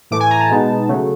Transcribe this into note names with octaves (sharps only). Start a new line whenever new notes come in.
A2 E3 A3 D6
G#5
A#5
A5
B2 G#3 B3 D#4
C#3 F#3 A3